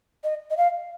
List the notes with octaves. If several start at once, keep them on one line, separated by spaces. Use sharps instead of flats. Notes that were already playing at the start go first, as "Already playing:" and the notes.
D#5
D#5
F5